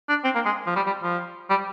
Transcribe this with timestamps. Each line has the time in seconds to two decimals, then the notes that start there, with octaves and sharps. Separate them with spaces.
0.09 D4
0.24 C4
0.35 A#3
0.45 G#3
0.66 F3
0.76 G3
0.86 G3
1.03 F3
1.49 G3